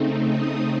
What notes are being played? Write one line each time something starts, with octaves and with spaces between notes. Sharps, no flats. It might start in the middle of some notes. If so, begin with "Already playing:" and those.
Already playing: C#3 A3 C4 D#4
D#6